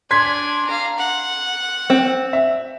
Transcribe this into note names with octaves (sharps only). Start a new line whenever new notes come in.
D4 G#5 C6 G#6 B6
F5 A#5
F#5
C4
E5